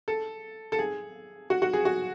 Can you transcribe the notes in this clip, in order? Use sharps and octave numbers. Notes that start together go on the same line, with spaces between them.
A4
A4
G#4
F#4
F#4
G#4
F#4